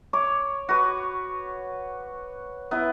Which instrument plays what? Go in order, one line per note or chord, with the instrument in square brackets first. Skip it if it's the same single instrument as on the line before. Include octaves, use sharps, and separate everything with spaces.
[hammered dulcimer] C#5 D6
F#4 B4
B3 E4 B4